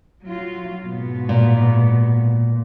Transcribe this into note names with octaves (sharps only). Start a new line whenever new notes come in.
F#3 F4
G#2 B2 B3
A#2